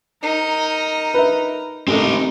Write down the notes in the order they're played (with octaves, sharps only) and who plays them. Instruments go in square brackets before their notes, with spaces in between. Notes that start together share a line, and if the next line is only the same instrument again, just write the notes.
[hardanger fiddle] D#4 [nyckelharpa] A#4 A#5
[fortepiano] B4 E5
[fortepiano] A1 A4 [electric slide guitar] C4 A#4 [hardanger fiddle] D#4